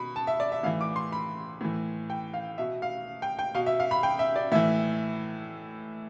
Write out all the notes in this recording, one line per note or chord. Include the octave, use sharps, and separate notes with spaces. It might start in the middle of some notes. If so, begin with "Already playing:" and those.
Already playing: B2 B5
A5
E5
D5
E5
A2 E3 F5
D6
C6
B5
A2 E3
G5
F5
B2 E5
F5
G5
G5
B2 F5
E5
F5
B5
G5
E5
D5
A2 E3 E5